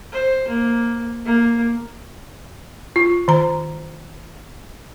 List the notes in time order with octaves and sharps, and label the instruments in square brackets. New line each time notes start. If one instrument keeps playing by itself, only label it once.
[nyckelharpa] C5
A#3
A#3
[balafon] F4
D#3 A#5